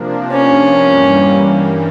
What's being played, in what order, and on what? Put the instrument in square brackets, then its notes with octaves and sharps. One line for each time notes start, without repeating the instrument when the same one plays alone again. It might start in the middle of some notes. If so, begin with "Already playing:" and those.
Already playing: [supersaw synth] C3 F3 A#3 D4
[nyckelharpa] C#4
[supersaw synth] G2 E3 G3 A#3